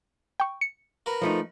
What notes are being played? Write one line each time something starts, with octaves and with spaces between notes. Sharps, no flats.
G5 C#6
C#7
F#4 A#4 B4
F3 A3 D#4